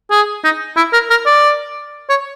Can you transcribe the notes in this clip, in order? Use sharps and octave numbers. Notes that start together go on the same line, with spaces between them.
G#4
D#4
E4
A#4
A#4
D5
C#5